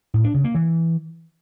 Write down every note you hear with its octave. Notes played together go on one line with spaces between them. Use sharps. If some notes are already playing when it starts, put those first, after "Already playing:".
A2
D4
C#3
A#3
E3